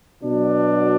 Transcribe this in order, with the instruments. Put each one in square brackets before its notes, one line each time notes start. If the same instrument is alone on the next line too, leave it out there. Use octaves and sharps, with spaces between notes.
[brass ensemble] B2 F#3 D4